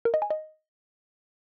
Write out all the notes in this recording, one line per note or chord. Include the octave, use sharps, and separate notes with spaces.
A#4
D#5
G#5
D#5